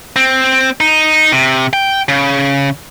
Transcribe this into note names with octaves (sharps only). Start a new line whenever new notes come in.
C4
D#4
C3
G5
C#3